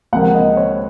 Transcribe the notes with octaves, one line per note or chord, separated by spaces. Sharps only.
C#2 C3 F3 A#3 F#5
D#5
C#5